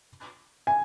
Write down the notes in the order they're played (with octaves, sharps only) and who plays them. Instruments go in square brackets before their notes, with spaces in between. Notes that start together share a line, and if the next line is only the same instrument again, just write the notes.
[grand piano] G#5